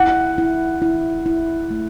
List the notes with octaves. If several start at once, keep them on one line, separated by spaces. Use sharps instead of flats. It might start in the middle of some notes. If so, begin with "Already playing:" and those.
Already playing: E4 F#5
E4
E4
E4
A3